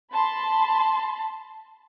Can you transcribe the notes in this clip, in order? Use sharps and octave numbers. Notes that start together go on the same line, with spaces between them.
A5 B5 C6